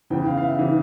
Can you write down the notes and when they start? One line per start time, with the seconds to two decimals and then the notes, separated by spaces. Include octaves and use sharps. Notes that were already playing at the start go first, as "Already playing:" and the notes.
0.10 E2 C#3 E3 G5
0.27 F5
0.38 F5
0.42 E5
0.59 C#3 E3